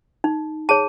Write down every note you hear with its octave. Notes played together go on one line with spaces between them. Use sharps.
D#4
G#4 C#5 A5